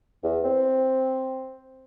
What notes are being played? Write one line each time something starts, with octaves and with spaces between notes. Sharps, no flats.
E2
C4